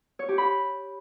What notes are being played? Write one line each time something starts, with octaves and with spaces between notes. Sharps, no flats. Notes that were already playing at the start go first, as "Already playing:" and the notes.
C#5
G4
B5